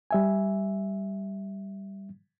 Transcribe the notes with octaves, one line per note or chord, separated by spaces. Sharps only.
G3 E5 G#5